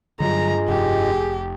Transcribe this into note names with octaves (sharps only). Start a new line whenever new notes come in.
G2 D3 F#3 G3 F4 G#4 D#5 A#5
F1 G4